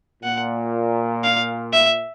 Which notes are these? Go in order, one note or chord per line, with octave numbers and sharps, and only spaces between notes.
A#2 F#5
F5
E5